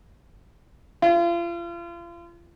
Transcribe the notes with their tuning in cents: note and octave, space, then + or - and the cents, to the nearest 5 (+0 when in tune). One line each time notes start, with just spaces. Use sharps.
F4 -35